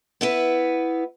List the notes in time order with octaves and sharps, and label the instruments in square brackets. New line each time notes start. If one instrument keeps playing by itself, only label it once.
[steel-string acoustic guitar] B3 E4 B4